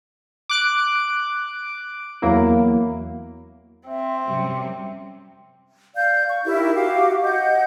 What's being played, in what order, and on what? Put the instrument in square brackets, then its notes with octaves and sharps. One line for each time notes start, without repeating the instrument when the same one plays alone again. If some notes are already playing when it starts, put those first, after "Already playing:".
[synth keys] D6 F#6 D7
E2 F#3 A#3 E4
[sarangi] C4 [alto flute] E5
[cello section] F#2 C3 G3 [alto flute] E5
[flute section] D5 F5 G6
C#6
D#4 E4 G4 A#4
F#4 G4 F5 D6
D#5 F#5 G6